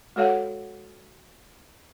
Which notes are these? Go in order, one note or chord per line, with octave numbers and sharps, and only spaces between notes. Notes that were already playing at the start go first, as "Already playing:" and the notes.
G#3 F#4 A4 C#5 F5 F#5